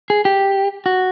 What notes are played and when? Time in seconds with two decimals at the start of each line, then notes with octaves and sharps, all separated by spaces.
0.10 G#4
0.25 G4
0.86 F#4